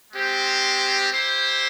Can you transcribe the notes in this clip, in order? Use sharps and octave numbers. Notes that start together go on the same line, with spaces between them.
G#3 C4 G4 C5
E4 G4 C5